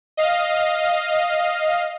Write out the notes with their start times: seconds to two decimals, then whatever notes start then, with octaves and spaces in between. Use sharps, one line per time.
0.17 D#5 F5